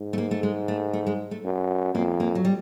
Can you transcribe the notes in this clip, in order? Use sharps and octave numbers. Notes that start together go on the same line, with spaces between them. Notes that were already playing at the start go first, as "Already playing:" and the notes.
Already playing: G#2
A3
A#3
A3
G#3
A3
A3
G#3
A3
F#2
F2 A#3
A#3
F#3
G3